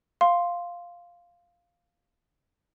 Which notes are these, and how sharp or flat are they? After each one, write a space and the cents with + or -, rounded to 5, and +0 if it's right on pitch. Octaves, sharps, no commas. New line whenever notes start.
F5 +0 C6 +0